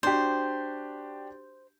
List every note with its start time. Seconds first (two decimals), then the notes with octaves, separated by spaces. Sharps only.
0.03 D4 F#4 G4 C5